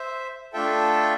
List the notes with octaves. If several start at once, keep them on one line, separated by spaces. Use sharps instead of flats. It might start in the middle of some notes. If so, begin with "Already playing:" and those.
Already playing: C5 E5
A3 D4 F4 A4 E5 G5